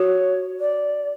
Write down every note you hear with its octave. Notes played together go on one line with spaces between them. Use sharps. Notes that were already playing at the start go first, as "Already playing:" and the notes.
Already playing: F#4 C#5
D5